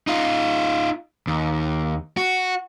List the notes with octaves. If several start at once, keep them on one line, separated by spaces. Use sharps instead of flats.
D#4 F4
D#2
F#4